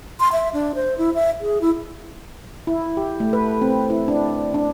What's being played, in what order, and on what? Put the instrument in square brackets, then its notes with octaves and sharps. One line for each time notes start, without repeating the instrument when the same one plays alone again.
[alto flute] C6
E5
D4
C5
E4
E5
G#4
E4
[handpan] E4
G4
A3
B4
C4
E4
D4
D4